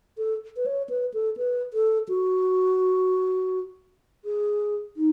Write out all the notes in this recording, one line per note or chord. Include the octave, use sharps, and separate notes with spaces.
A4
B4
C#5
B4
A4
B4
A4
F#4
G#4
D#4